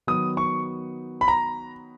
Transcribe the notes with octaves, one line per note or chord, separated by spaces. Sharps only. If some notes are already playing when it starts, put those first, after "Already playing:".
D#3 F#3 B3 D#6
C#6
B5
A#5